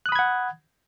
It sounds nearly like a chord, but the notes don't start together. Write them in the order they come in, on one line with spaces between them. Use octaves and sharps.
F#6 D#6 B5 G#6 F#5